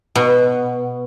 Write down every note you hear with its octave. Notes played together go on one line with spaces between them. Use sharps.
B2